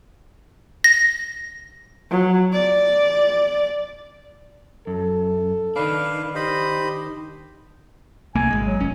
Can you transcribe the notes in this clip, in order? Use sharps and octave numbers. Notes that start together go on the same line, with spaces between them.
A#6
F#3
D5
F#2 A4
D#3 D4 B4 F5
G4 C5 D#5 B5
C2 A3 A#3 G#5
G#1 G#3
F#3
F1 C#4